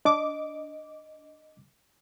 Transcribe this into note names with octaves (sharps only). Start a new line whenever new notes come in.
D4 D#5 D6